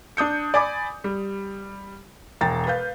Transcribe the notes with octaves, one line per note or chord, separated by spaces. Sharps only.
D4 D#6 G6 C#7
D5 G#5 B5 D6
G3
E1 G5 A#5 A6
B4 F5 G6